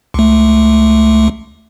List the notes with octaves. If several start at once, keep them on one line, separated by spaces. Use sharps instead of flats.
C#2 A3